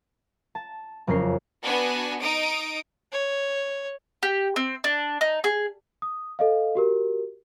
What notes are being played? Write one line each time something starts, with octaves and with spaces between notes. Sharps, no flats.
A5
F#1 F2 C#4 A#4 C7
B3 D4 F#4 G#5
D#4 D#6 D7
C#5
G4
C4
D4
D#4
G#4
D#6
A4 D#5 F5
F#4 G4 A#4